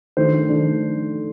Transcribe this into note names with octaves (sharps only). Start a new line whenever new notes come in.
D#3 A3 D4 C5
D#3 A3 D4